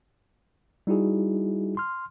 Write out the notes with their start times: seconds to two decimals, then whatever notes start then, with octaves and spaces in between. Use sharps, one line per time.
0.87 G3 D#4 E4 F#4 G#4
1.77 C6 F6